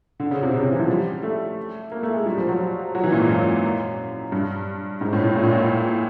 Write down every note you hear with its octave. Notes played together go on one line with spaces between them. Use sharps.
D3
C#3
C3
C#3
C3
E3
F3
G3
A3
A#3
A3
G#3
G3
F3
F#3
F#3
E3
A#2
G#2
F#2
G2
G#2
A2
A2
A#2
A2
A#2